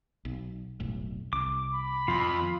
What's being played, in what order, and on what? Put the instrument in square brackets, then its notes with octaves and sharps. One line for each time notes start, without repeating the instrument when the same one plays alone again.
[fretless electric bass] B1
F1 B1 A2
[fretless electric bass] C2 [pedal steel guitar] D6
[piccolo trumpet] B5
[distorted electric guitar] F2 [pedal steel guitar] F4